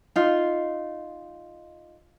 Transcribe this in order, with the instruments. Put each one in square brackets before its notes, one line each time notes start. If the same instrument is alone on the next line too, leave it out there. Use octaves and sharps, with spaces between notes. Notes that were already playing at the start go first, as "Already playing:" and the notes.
[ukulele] D#4 F4